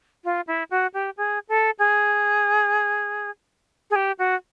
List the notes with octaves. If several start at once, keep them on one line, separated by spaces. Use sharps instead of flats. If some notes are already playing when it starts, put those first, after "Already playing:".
F4
E4
F#4
G4
G#4
A4
G#4
G#4
G4
F#4